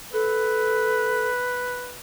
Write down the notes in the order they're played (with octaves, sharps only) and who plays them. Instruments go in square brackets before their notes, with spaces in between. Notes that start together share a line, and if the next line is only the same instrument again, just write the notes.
[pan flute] A4 [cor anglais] B4